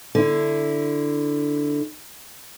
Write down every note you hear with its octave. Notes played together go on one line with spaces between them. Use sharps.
D3 E4